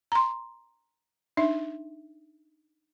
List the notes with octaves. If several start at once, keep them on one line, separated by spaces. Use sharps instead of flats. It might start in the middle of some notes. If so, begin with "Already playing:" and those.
A#5 C6
D4 D#4 E5